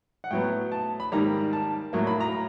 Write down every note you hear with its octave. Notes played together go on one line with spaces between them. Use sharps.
F#5
A2 F#3 B3 G5
A5
B5
G#2 D#3 G3 A#3 A#5
A5
A2 F#3 A#3
B5
A#5